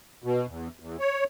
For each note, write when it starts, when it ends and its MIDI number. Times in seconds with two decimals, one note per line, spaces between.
0.24 0.46 47
0.48 0.68 40
0.80 0.97 40
1.00 1.24 73